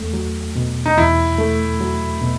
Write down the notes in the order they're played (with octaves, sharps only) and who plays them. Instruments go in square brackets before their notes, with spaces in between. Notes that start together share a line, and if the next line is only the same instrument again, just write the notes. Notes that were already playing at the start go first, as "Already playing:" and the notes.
Already playing: [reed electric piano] E2 A3
F#3
B2
[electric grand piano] D#4
[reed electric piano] E2 [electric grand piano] E4
[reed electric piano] A3
F#3
B2